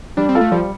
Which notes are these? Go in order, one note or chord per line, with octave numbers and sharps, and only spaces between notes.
G3 D4
C4
F4 A4 F5
A3
F3 G3